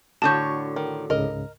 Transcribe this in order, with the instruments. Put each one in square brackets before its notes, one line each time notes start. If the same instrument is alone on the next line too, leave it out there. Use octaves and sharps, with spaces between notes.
[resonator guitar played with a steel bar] A2 D3 C#5 [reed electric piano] F#4 [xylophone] A5 G6
[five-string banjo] D#3
[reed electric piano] C#2 G#2 C#3 [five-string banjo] A#4 D#5